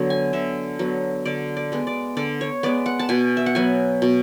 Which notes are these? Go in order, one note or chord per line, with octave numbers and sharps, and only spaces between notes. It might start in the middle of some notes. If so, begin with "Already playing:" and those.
Already playing: D3 F#3 B3
G#5
D3 E5
F#3 B3
D3 D5
D5
G#3 B3
D5
D3 D5
C#5
G#3 B3 D5
F#5
A5
B2 G#5
E5
F#5
F#3 B3 G#5
B2